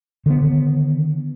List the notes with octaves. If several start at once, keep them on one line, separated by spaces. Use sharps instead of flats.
D3 D#3 A#3 B3